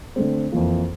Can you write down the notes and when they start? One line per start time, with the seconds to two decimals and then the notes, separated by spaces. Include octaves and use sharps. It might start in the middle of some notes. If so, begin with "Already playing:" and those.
0.16 D3 A3 C4
0.52 F2 E3 A#3 F4